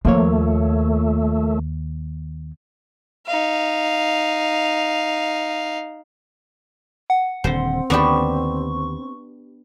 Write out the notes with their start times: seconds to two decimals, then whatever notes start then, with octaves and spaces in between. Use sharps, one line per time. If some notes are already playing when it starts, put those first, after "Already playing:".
0.05 D#2 F3 A3 A#3 C#5
3.26 D#4 F5
7.10 F#5
7.44 D#1 D3 C4 C5
7.90 D#2 D3 B3 D4 G4 C#6